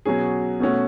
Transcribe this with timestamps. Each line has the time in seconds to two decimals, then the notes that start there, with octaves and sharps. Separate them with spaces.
0.05 B2 F#3 C#4 G#4
0.60 B2 A3 C#4 F#4